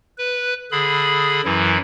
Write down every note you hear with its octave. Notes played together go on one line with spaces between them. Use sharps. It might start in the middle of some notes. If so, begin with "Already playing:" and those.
B4
D3 G#4 B5
F#2 E3 F#3 E4